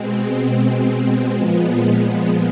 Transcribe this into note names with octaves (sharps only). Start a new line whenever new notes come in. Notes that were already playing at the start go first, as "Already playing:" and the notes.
Already playing: B2 G#3 C4
A#2 F3 G#3 B3